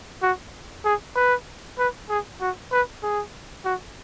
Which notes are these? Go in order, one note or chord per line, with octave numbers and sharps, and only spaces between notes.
F#4
G#4
B4
B4
G#4
F#4
B4
G#4
F#4